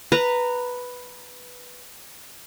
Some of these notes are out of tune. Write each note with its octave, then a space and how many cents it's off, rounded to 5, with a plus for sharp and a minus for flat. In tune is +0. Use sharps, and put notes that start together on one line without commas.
B4 +0 A#5 -15